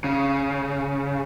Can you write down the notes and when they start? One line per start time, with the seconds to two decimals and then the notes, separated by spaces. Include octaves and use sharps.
0.04 C#3